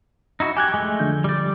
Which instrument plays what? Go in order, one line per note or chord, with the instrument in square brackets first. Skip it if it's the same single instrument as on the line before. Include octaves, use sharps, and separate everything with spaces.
[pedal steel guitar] D#4 E4 F#4
[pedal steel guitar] G4 [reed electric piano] G#5 F#6 G#6
[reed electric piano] F2 [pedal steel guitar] G#3 A3
[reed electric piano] D3 F3 G6
[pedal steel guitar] G3 D5